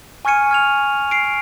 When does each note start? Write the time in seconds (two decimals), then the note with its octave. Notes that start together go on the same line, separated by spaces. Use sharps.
0.25 G#5 C#6 F6 G#6 C#7 D#7
0.51 F6 G#6 F7
1.11 C7 D7